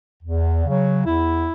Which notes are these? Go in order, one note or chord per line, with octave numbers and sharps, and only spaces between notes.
E2
C#3 F#3
E2 E4